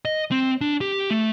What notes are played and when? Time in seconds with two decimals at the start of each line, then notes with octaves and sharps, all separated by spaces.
0.05 D#5
0.31 C4
0.61 D4
0.81 G4
1.11 A3